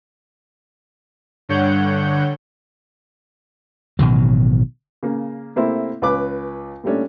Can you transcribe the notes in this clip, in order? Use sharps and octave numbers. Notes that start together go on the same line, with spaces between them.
G2 D3 C#5 F#5 G6
A1 B2 D#3 F#3
C#3 A#3
C3 A3 A#3 C4 E4
C#2 C#4 B4 D6
A#2 G3 A3 C#4 D4